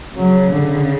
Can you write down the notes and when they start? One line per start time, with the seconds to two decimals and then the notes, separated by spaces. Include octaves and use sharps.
0.16 C#3 F#3
0.50 D3